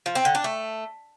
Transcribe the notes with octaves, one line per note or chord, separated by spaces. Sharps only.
F3
C4
D3
D4
A3